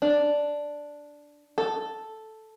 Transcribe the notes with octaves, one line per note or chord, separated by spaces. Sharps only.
D4
A4